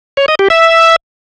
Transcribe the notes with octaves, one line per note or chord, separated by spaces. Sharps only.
C#5
D#5
G4
E5